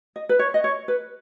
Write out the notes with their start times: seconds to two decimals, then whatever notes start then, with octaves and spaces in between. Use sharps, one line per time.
0.16 D#5
0.29 B4
0.39 C#5
0.54 D#5
0.64 C#5
0.88 B4